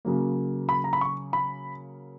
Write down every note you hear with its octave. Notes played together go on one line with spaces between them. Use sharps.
C#3 F#3 A#3
B5
A#5
B5
C#6
B5